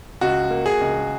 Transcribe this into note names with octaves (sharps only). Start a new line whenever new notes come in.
C#2 F#4
A#3
G#4
C#2